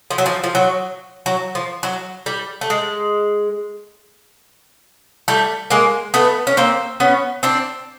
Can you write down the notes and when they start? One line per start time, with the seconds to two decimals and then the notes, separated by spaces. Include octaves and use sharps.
0.10 F3
0.18 F#3
0.26 F3
0.44 F3
0.55 F#3
1.26 F#3
1.55 F3
1.83 F#3
2.26 G3
2.61 A3
2.70 G#3
5.28 G3 A3
5.70 G#3 A#3
6.14 A3 B3
6.47 C#4
6.57 A#3 C4
7.00 B3 C#4
7.43 C4 D4